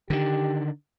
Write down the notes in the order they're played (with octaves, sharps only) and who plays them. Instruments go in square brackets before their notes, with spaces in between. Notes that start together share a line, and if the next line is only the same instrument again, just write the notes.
[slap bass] D3 D#3 [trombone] G4